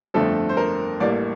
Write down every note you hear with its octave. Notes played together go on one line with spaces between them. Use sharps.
G1 F2 D3 A3 A4
C5
A#4
A1 A2 G3 A#3 D5